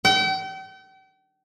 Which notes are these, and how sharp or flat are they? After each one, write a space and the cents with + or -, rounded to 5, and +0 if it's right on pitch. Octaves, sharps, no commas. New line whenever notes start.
G5 -40